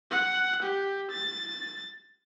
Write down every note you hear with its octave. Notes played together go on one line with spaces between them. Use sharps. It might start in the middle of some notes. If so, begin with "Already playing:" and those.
F#5
G4
A6